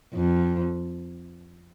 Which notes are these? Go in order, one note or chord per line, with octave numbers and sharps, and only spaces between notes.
F2